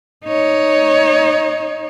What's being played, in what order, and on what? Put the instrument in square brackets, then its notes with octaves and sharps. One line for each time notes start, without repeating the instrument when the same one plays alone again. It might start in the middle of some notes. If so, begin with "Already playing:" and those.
[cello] D#4 C#5